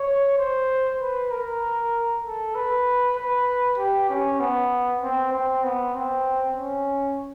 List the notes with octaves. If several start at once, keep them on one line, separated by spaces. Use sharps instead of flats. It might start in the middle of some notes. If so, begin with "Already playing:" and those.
Already playing: C#5
C5
B4
A#4
A4
B4
B4
G4
C#4
B3
C4
C4
B3
C4
C#4